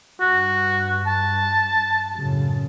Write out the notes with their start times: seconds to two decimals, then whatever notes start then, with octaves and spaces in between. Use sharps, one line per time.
0.20 G2 F#4
1.07 A5
2.15 F#2 A2 C#3